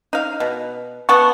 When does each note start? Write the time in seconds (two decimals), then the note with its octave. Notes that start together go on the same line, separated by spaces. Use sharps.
0.13 D#4 F5
0.40 B2
1.09 B3 F#5 A5 C#6